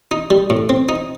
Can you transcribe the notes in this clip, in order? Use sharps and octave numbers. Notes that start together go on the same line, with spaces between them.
D#4
G3
A2
C4
D#4